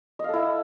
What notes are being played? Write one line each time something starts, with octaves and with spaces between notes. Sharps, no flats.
E4 A4 D#5 F5